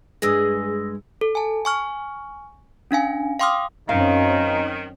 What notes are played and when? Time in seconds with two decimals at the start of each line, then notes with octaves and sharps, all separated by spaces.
0.22 G2 G#3 G#4 D#6 E6 A#6
1.21 A4
1.35 G#5 A5
1.65 G#5 C#6 F6
2.91 C#4 D4 F5 G#5
3.40 F5 G5 C6 D6 D#6 F6
3.89 F#2 D#3 C4 C#4 D#4 F5